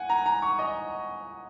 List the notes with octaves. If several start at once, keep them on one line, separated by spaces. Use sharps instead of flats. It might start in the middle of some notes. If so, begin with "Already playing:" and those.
Already playing: F#5 G#5
A#5
A#5
C#6
D#5